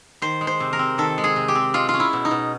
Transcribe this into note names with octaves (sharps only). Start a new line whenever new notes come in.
D#3 C5
G#3
C5
C3
A#4
C4
D#3 A4
G#3
G#4
C3
G4
C4
G#3 F4
F4
C#4
E4
B2
D#4
B2